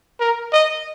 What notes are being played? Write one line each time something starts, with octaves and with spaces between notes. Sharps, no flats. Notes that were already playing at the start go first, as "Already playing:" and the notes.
A#4
D#5